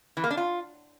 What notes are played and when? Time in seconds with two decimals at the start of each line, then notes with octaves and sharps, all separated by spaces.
0.17 E3
0.24 A#3
0.31 D4
0.37 F4